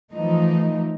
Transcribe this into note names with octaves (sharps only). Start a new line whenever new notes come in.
E3 F3 A3 D#4